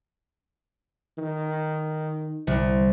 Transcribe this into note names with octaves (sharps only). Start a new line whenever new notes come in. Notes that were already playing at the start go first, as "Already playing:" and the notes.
D#3
C2